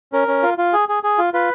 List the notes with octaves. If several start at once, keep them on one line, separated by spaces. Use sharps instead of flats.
C#4 A#4
C#4
F4
F4
G#4
G#4
G#4
F4
F4 B4